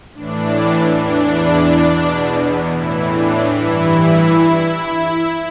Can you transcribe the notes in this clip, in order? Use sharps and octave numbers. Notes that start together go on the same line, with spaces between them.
A2 E3 D4
E2 E3 D4
E2 B2
A2 E3 E4
D4
G2 E3 E4